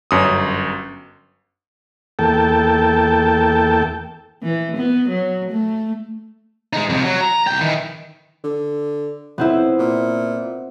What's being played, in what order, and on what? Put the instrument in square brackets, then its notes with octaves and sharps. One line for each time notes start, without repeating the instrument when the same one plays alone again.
[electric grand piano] G1 F#2 D#6
[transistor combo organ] E2 A#3 A4 G5 A5
[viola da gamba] E3
B3
F#3
A3
[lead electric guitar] G#3 D#4
F2 C3
F#3
A#5
C2 G5
D#3 E3
[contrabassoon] D3
[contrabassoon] F2 [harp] B3 C4 E4
[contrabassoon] A#2